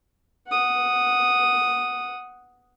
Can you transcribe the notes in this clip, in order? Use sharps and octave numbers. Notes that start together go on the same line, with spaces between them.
F#5 D#6